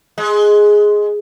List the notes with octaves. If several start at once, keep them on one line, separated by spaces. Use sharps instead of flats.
G#3